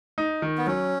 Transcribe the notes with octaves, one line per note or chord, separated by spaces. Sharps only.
D#4
D#3
B3
F#3 C#4